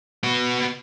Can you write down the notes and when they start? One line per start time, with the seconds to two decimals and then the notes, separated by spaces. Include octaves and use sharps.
0.23 B3 F#4